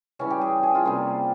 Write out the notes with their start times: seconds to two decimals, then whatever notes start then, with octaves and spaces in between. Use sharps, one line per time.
0.19 C#3 E3 G3 C#4
0.30 G4
0.41 G#4
0.63 G#4
0.75 F4
0.85 C3 G3 A#3